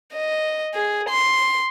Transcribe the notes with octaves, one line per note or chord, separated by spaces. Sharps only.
D#5
G#4
C6